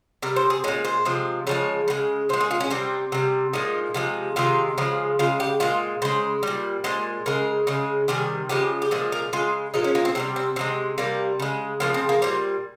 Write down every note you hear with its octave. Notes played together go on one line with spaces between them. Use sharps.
C3 G3 A#4
C5
G#4
A#2 G#3 C#4
C5
C3 F3 G#3
C#3 F3 G#3 C#5
C#3 F3 G#3
A#2 G#3 C5
G#4
F4
C#4
C3 G3 C4
C3 G3
A#2 F3 G#3 D#4
C3 F3 G#3
C3 D#3 G#3 F4
C#3 F3 G#3
C#3 G#3 F4
G4
A#2 G#3 F4
C#3 G#3 C5
A#2 G3
A#2 G#3 C5
C#3 G#3 A#4
C#3 G#3
C3 D#3 G3 G#4
C#3 F3 G#3 G4
G4
A#2 F3 G#3 G#4
A#4
C#3 G#3 F4
A#2 F3 G#3 D#4
C#4
A#3
C4
C3 D#3 G3 C4
C4
C3 F3 G#3 C4
C3 G3 A#3
C#3 G#3
C#3 F3 G#3 A#3
C4
A#3
A#2 G3 C4